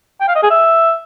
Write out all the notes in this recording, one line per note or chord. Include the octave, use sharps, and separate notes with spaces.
G5
F5
D#5
G#4
E5